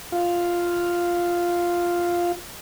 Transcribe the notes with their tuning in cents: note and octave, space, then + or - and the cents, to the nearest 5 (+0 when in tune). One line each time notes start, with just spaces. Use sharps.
F4 +0 F5 +0